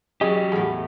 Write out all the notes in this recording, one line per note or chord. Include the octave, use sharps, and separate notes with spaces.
F#3 C#4 G4 G#4 D#5
E2 A2 G#4